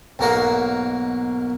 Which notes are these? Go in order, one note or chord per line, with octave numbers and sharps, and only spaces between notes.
B1 G#2 A#3 F#4 A#4 F5